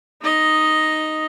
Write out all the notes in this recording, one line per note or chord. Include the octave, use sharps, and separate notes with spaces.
D#4 D#5